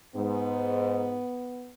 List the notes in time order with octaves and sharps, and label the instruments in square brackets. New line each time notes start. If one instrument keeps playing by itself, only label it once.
[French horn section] G#2 [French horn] B3